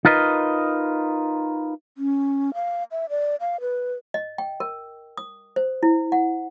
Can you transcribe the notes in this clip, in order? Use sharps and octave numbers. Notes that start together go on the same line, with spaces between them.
D#4 F4 A#4 B4 D#5
C#4
F5
E5
D5
F5
B4
D#5
G5
A#4
D#6
C5
E4
F#5